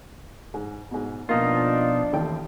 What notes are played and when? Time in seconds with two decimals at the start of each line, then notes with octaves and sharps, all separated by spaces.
0.54 G#2
0.91 G#2 B2
1.29 B2 F3 A#3 D4 D#4 F4
2.13 A1 D#2 G5